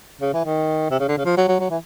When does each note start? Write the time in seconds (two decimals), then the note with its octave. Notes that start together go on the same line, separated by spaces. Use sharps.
0.21 C#3
0.34 E3
0.45 D#3
0.91 C3
1.00 C#3
1.08 D3
1.17 C#3
1.25 F3
1.37 F#3
1.48 F#3
1.60 F#3
1.70 E3